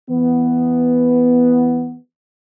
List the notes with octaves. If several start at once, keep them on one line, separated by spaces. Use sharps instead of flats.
E3 B3